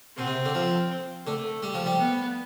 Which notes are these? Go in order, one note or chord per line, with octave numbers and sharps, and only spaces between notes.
B2 C4
C3
D3
F3
D3 A3
G3
F3
G3
B3